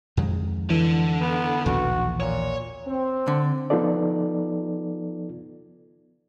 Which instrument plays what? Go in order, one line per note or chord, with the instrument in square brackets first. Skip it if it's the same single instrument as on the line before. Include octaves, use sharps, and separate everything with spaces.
[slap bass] F2 D#3 G#3
[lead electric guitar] D3 [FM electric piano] E3
[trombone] B3
[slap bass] A#1 D#2 B2 [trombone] F#4
[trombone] A#2 [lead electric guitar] C#5
[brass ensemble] C4
[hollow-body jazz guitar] D3
[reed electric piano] F3 B3 D#4 F4 A4 D5